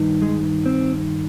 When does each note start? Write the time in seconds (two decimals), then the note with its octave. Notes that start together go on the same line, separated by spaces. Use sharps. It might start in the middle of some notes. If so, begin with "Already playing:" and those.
Already playing: G2 D#3
0.22 G#3
0.66 C4